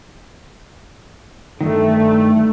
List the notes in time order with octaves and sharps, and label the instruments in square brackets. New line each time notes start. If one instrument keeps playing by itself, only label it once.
[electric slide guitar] G2 D#3 [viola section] A3